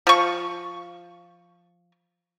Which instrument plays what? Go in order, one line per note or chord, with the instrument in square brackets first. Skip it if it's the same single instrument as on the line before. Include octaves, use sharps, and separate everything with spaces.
[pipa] F3 C#6